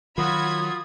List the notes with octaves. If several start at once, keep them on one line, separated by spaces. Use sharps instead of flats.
D#3 F#3 F4 F#4 B5 D#6 G#6